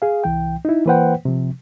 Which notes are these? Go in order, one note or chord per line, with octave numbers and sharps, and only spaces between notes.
G#4 F5
C2 E3 G5
D#4 E4
E3 A#3 B4 C5 F#5 G5
C3 F3